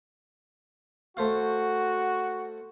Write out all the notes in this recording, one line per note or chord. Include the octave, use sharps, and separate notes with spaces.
A3 F#4 C5 F5